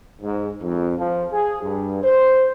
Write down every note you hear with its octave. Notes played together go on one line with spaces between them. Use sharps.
G#2
F2
F3
G#4
G2
C5